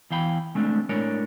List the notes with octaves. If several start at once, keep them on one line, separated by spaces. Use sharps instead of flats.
E2 E3 F5 G5 B5
G#3 A3 C4 D4
A2 G#3 D4 A#4 C#5